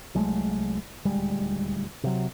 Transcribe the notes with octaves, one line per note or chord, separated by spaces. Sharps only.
C2 F#3 G#3 A3
D#1 D2 G3 G#3
C3 F#3